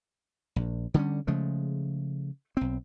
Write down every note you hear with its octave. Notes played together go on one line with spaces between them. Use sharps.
A#1
D3 G3 C4 C#4
C#3 F3 G#3 A3
B1 C4